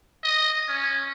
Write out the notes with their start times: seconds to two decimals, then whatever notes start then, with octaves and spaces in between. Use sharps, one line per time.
0.24 D#5
0.68 C#4